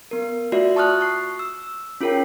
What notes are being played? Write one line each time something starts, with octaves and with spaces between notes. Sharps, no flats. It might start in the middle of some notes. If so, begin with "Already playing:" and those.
B3 A#4
A3 F4 F#4 D5 E5
A5 C#6 D#6 F6 F#6
C#6 C7
E6
C#4 F4 G#4 A#4 C#5 G5